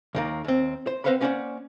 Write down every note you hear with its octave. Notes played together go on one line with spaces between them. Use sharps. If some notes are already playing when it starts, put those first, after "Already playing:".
D#2 D#3 A#3
D#2 C4
C5
C4 B4 C5 F5 F#5 B5
A#3 B3 C#4 C5 D5 F#5